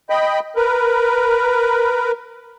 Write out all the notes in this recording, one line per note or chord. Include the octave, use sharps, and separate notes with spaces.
D#5 G5 B5
A#4 B4